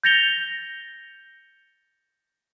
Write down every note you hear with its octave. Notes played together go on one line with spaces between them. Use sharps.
G6 A6 A#6 C#7 F7 G7